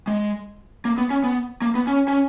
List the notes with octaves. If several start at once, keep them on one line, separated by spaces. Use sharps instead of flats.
G#3
A#3
B3
C#4
B3
A#3
B3
C#4
C#4